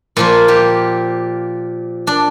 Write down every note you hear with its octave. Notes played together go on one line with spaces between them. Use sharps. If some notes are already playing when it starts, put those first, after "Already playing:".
A#2 F3 A#3 F4
G4
D4